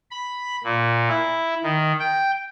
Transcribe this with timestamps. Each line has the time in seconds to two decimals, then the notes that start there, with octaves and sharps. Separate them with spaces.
0.11 B5
0.64 A#2
1.09 E4
1.64 D#3
1.99 G5